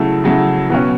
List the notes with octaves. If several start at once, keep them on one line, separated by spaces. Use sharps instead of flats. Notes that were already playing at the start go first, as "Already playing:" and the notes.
Already playing: C#3 F#3 A3 E4
C#3 F#3 A3 E4
B2 F#3 C#4 F#4